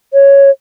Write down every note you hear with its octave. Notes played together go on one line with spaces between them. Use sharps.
C#5